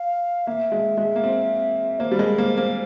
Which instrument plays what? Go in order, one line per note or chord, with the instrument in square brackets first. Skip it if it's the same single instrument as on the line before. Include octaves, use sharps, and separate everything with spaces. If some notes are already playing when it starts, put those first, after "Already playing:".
Already playing: [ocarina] F5
[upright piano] A#3 [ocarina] E5
[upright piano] G#3
G#3
A#3
C4
[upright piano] A#3 [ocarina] C5
[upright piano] G3
[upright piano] G#3 [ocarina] A#4
[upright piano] A#3 [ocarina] C5
[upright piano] A#3 [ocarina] C5